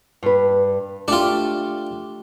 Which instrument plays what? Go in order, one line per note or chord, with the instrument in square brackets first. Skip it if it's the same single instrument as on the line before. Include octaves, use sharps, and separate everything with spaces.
[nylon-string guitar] G2 B4
[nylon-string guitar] A3 G4 [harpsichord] D4 F4